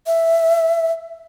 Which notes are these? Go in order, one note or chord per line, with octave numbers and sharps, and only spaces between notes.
E5